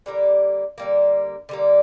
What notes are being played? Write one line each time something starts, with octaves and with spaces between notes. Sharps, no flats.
D3 G3 A#3
D3 G3 A#3
D3 G3 A#3